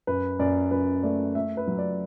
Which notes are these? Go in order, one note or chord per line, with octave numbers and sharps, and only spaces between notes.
F#2 B4
F#2 D5
F#2 B4
A3 D5
A3 E5
B4
F#3
D5